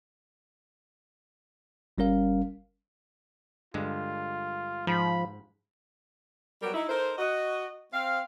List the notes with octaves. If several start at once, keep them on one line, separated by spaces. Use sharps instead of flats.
G1 G3 C#4 A#4 F5
G2 D3 G#3 F4
G#2 F3 B5
F#3 G3 B3 F#4 G4 A#4
D#4 E4
D#4 A4 A#4 C5
F#4 D#5
C4 F5